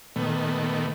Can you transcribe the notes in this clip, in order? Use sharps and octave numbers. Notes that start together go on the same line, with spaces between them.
A#2 D#3 A3 B3